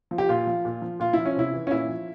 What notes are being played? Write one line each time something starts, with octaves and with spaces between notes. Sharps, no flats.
F3
G4
A#2 F4
F3
A#2
F3
A#2 F4
F3 E4
C#4
C3 E4
E3
C#4
A#2 E4
F3